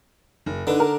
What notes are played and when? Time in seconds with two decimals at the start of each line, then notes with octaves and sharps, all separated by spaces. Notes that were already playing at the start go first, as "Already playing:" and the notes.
0.46 F#1
0.67 D3 D#4 B4
0.80 A#4